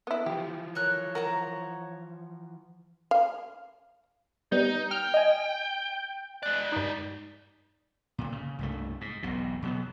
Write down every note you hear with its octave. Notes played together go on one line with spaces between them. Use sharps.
B3 E4
E3 F3 G4
A4 A#4 C#5 F#6
F#4 A#4 A5 A#5
F5
G3 B3 D#4
G5 F6
D#5 G#5
G#3 D5 F#6
G2 D#4
D1 A#2
C#3
C2 G2 A3
G#2
E1 B1 B2
B2 F#3 B3